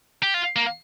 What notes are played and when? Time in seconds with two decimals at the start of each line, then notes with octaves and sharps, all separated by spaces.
0.23 G4
0.34 F4
0.56 A#3